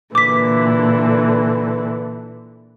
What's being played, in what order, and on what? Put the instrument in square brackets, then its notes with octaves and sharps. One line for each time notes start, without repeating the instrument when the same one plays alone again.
[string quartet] A#2 D3 E3 [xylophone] D6 B6